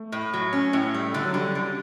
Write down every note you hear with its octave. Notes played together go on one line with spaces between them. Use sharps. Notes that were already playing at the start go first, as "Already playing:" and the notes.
Already playing: A3
A2
F#3
C#4
A2
G3 A3
D3
F#3
D3 G3
D3